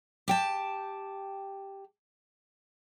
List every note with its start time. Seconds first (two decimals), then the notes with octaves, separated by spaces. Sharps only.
0.28 G4 G5 A5